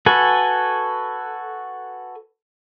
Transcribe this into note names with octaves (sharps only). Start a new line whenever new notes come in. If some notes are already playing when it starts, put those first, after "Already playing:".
F#4 A4 B4 G#5